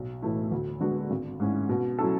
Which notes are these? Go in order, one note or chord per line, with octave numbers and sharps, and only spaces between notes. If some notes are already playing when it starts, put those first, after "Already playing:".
Already playing: B1
A2 E3 A3 E4
D2
D3 G#3 B3 F#4
G#1
G#2 G#3 C#4 E4
B2
F#3 C#4 E4 A4